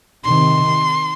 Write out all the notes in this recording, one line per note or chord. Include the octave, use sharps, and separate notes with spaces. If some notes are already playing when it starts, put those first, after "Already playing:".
C3 D#3 C6